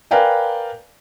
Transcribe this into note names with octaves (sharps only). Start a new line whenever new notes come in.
A#4 B4 D5 F5 G5 G#5